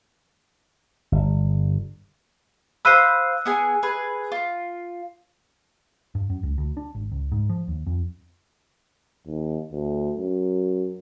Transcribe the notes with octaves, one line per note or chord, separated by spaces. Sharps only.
G1
C5 F5 B5 E6 F#6 D#7
B3 G#4 G#5
G#4 B4
F4
G2
F#2
C#2
D2
D4
G#1
C#2
G#2
F3
D#2
F2
D#2
D2
F#2